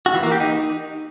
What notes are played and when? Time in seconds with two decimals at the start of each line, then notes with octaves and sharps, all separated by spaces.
0.06 F#4
0.15 E3
0.23 A#3
0.32 G4
0.40 D#4